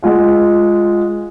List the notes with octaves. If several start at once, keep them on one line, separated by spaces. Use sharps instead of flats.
G#3 F4 F#5